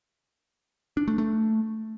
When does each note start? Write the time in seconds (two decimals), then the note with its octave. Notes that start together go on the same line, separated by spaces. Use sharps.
0.97 D4
1.08 A3
1.18 A3